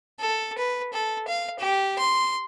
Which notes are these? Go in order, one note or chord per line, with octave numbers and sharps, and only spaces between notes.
A4
B4
A4
F5
G4
C6